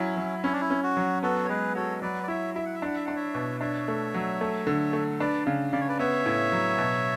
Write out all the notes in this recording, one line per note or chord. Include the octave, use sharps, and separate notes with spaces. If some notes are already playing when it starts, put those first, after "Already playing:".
Already playing: F#3 C#4 E4
F#3
C#4 E4
D4
E4
C#4
F#4
F#3
B3 F#4 A4
C#5
G#3 G#4 B4
F#4 A4 C#5
F#3 B4 D5
D5
E4 C#5 E5
E4 E5
F#5
E5
D4 F#5
E5
D4 F#5
C#5 E5
B2
D4 C#5 E5
A3
F#3
A3
D3
A3
D4 B4 D5
C#3
C#3 D5
C#5
B4 D5
B3 C#5 E5
A2
F#3
B2